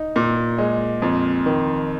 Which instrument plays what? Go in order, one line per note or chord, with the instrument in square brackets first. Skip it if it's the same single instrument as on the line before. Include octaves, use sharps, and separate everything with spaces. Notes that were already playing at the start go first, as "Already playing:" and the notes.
Already playing: [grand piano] D#4
A#2
G#3
F2
D#3